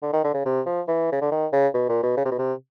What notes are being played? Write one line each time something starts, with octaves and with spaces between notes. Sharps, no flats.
D3
D#3
D3
C#3
C3
F3
E3
C#3
D3
D#3
C#3
B2
A#2
B2
C#3
C3
B2
C3